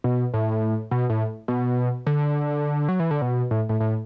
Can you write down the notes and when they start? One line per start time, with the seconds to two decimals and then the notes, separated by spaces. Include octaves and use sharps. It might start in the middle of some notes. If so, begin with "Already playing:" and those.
0.04 B2
0.34 A2
0.91 B2
1.10 A2
1.48 B2
2.07 D3
2.88 F#3
3.00 E3
3.11 D3
3.22 B2
3.51 A2
3.69 A2
3.80 A2